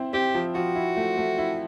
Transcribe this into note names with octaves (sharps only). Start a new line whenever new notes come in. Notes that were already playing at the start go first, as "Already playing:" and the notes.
Already playing: C4 E4
C4 G4
F3
F3 F#4
E4
A3
A3
E4